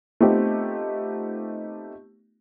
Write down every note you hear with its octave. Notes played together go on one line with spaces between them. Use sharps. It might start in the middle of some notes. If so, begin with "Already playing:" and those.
A3 B3 C4 D#4 F4 G4